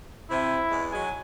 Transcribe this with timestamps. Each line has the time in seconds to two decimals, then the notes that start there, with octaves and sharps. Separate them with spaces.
0.30 C3 E4
0.70 E2 G#3
0.92 F#3 G#3 G#5